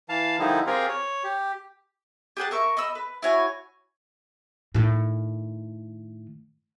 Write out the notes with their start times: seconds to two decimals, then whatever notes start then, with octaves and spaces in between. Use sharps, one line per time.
0.09 E3 F5 A5
0.39 D3 D#3 F3 G3 D#4 E4
0.67 C4 F4 G4 G#4 A#4
0.89 C#5
1.24 G4
2.37 G4 G#4 F#5 A5
2.51 A#4 E5 C#6
2.77 D#5 B5 E6
2.95 B4
3.22 E4 F#4 C#5 G#5
4.74 A2 D#3